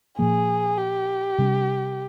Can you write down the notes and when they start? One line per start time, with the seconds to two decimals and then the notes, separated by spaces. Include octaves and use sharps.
0.18 A#2 F3 A#3 G#4
0.78 G4
1.38 C3 G3 D4